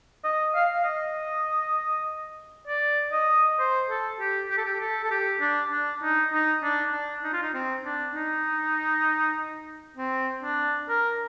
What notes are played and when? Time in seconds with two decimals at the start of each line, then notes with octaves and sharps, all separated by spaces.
0.24 D#5
0.55 F5
0.73 F5
0.84 D#5
2.68 D5
3.12 D#5
3.59 C5
3.90 A4
4.20 G4
4.51 G4
4.58 A4
4.65 G4
4.80 A4
5.04 A4
5.11 G4
5.41 D4
5.72 D4
6.03 D#4
6.33 D#4
6.63 D4
6.93 D4
7.24 D#4
7.33 F4
7.43 D#4
7.54 C4
7.84 D4
8.15 D#4
9.97 C4
10.43 D4
10.89 A#4